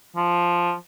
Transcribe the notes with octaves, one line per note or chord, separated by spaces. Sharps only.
F3